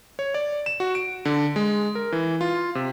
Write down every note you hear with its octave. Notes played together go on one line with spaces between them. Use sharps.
C#5
D5
E7
F#4
D7
D3
G#3
A#4
E3
F4
C3